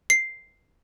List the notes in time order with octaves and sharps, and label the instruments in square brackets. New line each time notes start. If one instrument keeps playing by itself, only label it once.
[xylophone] C7